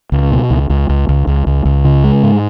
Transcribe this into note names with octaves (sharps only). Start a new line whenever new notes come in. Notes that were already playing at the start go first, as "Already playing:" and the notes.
C#2
B2
C#2
C#2
C#2
C#2
C#2
C#2
C#2
C#3
G#3
G#2